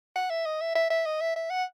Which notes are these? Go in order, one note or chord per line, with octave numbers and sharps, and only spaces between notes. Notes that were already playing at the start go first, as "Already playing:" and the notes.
F#5
E5
D#5
E5
E5
E5
D#5
E5
E5
F#5